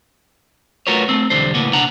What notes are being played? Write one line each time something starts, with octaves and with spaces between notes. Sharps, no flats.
A3 F4 F#4 A#4 B4 C#5
A3 A#3 C4
B1 E2 D3 G3 C5
A2 C#3 A#3 B3
B2 D4 F#5 A#5